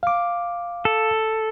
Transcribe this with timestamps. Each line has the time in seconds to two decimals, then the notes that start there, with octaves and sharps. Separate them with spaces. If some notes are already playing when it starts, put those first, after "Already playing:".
0.03 F5 D6
0.85 A4